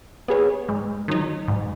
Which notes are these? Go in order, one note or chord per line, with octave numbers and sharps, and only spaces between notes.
B3 G#4 C#5
G#2
D#3 F#3 D#4
G#2